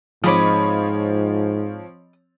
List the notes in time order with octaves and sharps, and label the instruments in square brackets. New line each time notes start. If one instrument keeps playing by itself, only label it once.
[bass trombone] G#2 [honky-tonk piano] F3 C4 C#5 [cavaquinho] D#5 B5 D6